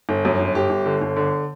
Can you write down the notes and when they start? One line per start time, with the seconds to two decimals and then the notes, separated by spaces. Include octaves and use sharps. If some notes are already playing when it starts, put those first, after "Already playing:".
0.09 G1
0.25 F#2
0.40 G1
0.55 G1 G4
0.70 G1
0.86 D3
1.01 G1
1.16 D3